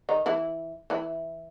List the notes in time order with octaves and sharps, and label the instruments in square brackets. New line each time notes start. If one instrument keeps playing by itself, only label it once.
[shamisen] D#3 D#4
E3 E4
E3 E4